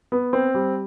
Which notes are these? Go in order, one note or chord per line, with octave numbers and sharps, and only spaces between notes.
B3
C4
G3